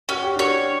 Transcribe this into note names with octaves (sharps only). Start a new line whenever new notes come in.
C#4 F#4
G4
D4 F#4 C#5